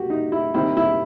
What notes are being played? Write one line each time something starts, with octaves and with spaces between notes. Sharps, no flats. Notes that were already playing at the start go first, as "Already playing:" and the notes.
Already playing: F#4 G4
D#4
E4
D#3 G3 C4 E4
E4